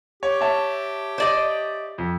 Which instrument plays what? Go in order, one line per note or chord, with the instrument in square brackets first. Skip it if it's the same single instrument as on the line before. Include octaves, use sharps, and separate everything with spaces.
[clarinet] G4 [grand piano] C#5
[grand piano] C#5 E5 A5
[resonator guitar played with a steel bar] C5 D5 D#5
[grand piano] F2